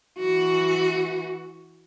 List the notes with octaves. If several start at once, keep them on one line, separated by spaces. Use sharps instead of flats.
E3 F#4